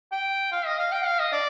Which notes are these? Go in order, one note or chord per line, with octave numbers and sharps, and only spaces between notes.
G5
F5
D#5
F5
G5
F5
D#5
D5